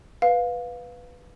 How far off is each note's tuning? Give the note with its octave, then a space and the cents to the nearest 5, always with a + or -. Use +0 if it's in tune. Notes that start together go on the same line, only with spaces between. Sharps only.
B4 +0 F5 +15